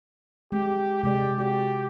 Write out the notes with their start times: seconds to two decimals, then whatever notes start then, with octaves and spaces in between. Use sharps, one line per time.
0.52 G#3 C4 G4
1.03 C3 G#3 G4 D5
1.38 F#4 G4 D5